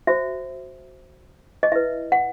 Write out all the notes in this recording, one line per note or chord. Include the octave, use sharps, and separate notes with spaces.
F#4 C5 E5
D#5
E4 B4 E5
F#5